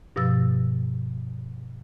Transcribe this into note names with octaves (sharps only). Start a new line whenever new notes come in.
G2 B2 F3 E6 A6